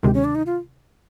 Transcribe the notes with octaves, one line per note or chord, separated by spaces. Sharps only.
D2 C3 D#3 G#3 G4
C#4
D4
D#4
F4